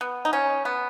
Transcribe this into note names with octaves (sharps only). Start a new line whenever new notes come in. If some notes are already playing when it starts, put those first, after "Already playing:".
B3
D#4
C#4
B3